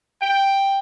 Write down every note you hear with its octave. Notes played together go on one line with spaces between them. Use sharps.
G5